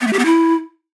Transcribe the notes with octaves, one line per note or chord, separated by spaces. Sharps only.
B3
A3
G4
B3
E4